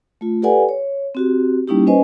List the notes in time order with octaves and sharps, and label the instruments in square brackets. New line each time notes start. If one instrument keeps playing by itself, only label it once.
[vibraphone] A3 F4
G4 A4 B4 D5 F#5 G#5
C#5
C4 F#4 G4
G3 A#3 C#4 D#4 E4 G4
C#4 B4 C5 D#5 G#5